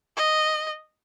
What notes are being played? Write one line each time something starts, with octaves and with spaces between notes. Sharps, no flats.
D#5